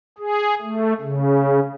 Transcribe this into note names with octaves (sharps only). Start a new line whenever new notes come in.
G#4
A3
C#3